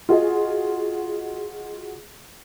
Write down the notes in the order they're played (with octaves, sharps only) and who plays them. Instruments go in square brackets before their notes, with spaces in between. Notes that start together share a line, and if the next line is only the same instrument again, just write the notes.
[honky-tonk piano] F4 F#4 G#4 D#5